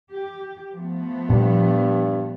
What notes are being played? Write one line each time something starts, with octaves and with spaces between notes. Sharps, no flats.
G4
F3 A3 B3
G2 A#2 G3